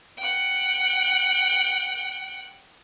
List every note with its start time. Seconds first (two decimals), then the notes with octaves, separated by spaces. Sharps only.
0.18 F#5 G5